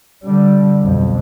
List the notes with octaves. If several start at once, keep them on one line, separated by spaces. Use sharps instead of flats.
D3 G3
B1 F2